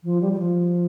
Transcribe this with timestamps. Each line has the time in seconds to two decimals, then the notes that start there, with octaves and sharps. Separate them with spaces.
0.04 F3
0.21 G3
0.33 G3
0.39 F3